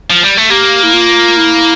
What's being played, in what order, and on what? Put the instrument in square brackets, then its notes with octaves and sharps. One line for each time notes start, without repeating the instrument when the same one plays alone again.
[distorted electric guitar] F3
G3
A3
[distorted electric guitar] A#3 [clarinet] G4
[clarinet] E4
F4
E4